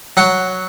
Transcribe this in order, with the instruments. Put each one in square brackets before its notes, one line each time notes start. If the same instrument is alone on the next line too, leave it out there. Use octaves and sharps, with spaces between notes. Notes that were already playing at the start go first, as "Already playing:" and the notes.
[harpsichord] F#3 F#5